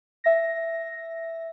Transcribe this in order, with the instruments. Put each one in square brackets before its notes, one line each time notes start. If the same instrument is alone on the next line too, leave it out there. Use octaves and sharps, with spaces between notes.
[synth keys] E5 A#6